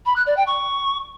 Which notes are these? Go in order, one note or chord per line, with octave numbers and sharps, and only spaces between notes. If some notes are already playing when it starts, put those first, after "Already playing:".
B5
F#6
D5
G5
C#6